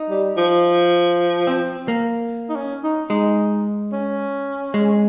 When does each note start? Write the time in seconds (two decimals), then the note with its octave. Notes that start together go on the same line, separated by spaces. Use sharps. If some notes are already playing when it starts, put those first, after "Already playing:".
Already playing: D#4
0.10 G3
0.37 F3
1.47 C4
1.88 A#3
2.49 D#4
2.56 C#4
2.84 D#4
3.10 G#3 D#4
3.93 C#4
4.74 G#3